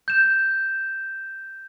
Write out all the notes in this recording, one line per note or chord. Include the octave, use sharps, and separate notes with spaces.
G6 E7